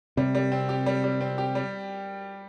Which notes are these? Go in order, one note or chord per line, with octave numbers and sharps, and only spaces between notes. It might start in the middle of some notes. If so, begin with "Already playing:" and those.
C3 G3
G3
C4
G4
G3
G3
C4
G4
G3